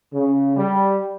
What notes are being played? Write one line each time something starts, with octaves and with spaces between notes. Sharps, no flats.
C#3
G3